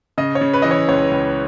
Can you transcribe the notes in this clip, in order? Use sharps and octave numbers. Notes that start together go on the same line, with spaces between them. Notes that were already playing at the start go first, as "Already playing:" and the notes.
C#3 D#5
C#5
C#3
B4
E3 D#5
C#5
C#2 C#5
C#2